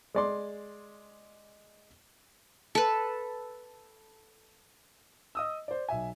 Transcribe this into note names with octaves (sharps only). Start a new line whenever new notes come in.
G#3 D5 C6
A4 B4
D#5 D#6 E6
C5 D5
B1 E5 G#5